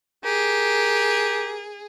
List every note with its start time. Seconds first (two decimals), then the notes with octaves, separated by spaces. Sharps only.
0.25 G4 G#4 A#4